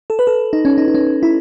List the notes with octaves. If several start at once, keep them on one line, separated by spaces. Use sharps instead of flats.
A4
B4
A4
D#4
C#4
D#4
D#4
C#4
E4